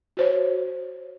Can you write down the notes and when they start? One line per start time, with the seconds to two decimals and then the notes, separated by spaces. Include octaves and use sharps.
0.17 F#4 C5 C#5